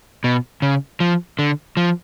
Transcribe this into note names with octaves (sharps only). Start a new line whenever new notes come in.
B2
C#3
F3
D3
F3